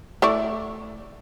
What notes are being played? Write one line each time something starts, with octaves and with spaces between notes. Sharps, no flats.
A3 E4 D5